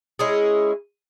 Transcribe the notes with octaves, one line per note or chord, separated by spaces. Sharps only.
G#3 C#4 E4 G#4